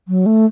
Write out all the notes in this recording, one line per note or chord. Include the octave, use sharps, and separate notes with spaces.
F#3
A3